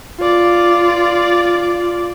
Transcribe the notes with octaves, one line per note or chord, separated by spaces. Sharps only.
F4 D5